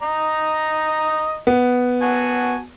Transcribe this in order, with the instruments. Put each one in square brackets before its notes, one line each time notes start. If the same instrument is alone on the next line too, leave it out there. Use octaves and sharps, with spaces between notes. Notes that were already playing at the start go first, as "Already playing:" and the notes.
[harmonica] D#5 A#5
[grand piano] B3
[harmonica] F#4 G#5 A5